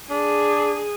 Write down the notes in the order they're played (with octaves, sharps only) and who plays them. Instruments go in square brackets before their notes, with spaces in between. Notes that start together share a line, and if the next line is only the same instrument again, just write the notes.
[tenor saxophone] D4 [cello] G#4